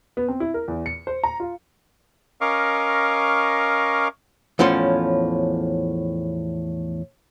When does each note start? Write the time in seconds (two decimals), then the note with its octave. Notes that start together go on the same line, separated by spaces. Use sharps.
0.17 B3
0.28 C4
0.40 E4
0.54 A#4
0.68 E2
0.86 C#7
1.07 C5
1.24 A#5
1.40 F4
2.41 C#4 A#4 D#5 F5 C#6 D6
4.59 E2 A2 F3 C#4 C6